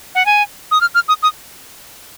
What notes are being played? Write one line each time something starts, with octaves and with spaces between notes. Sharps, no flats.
F#5
G#5
D#6
F6
F6
D#6
D#6